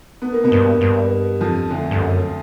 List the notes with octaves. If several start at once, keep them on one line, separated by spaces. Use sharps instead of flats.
B3
A#3
B2 B3
G2
G2
F2 F3
D2 D3
G2
F#2